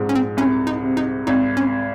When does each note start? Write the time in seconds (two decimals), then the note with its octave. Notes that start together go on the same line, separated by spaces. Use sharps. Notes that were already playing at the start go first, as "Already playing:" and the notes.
Already playing: A#1 G#2
0.09 C#4
0.15 C4
0.37 C2 C#4
0.67 D#4
0.83 C3
0.97 D#4
1.27 G#1 D#4
1.57 C#4